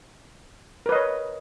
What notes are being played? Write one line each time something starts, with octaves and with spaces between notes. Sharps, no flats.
A#4 B4 C#5 D#5